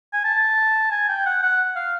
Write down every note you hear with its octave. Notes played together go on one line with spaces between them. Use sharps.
G#5
A5
G#5
G5
F#5
F#5
F5